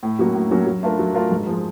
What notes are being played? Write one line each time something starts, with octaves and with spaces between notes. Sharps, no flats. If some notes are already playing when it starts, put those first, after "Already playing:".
A2
F#3 A#3 C#4 F#4
A2
F#3 A#3 C#4 F#4
F#3
A3 D4 F4 A#4
F#3
A3 D4 F4 A#4
G#2
F3 G#3